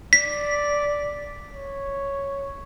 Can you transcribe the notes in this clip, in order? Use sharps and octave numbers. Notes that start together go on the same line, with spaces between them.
D5 B6
C#5